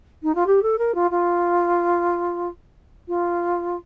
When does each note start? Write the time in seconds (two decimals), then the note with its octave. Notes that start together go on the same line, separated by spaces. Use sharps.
0.23 D#4
0.35 F4
0.47 G4
0.63 A4
0.78 A#4
0.95 F4
1.11 F4
3.08 F4